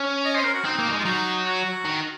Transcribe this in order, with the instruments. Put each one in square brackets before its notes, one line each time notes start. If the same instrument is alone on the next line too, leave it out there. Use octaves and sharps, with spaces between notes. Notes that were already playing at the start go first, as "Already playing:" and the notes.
Already playing: [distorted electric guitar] C#4
[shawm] D#5
C5
A#4
F#4
[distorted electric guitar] C4 [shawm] D#4
[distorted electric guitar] A#3
F#3
G#3
[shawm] F4
[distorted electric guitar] F#3 [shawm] D#4
[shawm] F#4
[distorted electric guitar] D#3